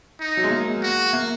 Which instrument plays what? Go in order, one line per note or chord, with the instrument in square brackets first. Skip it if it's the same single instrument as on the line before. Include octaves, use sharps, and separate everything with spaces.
[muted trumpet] D#4
[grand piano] F#3
G#3
A#3
[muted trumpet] F#4
[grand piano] A#3